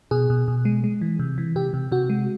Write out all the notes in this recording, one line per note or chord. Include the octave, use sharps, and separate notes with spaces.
B2 G#4
B2
B2
G#3
G#3
E3
C3
E3
C3 G4
C3
C3 F#4
G#3